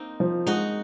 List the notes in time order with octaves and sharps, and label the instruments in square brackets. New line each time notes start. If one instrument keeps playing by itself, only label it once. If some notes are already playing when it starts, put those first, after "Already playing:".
Already playing: [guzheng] A#3 C4 D#4
[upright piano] F3
[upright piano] G#3 [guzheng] D#4 F#4